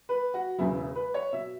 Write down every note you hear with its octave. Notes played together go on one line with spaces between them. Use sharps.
B4
F#4
E1 E2 C#3 E3 E4
B4
C#5
B2 E5